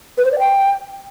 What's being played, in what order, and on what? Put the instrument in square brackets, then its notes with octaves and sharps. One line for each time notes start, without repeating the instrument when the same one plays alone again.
[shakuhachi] B4
C5
D5
G5